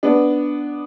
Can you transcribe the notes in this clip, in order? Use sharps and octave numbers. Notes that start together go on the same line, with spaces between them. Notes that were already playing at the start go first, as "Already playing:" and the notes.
B3 D4